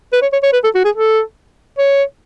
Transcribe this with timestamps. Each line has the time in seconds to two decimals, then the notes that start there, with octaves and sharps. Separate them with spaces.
0.13 B4
0.22 C#5
0.33 C#5
0.43 C#5
0.53 B4
0.64 A4
0.75 F#4
0.85 G#4
0.95 A4
1.78 C#5